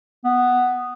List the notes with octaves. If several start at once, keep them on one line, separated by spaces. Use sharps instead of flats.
B3